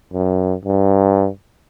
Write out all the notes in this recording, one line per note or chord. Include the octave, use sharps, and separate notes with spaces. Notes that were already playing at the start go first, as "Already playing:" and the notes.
F#2
G2